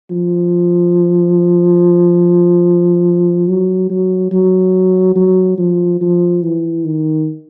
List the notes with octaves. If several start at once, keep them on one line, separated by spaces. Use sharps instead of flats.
F3
F#3
F#3
F#3
F#3
F3
F3
E3
D#3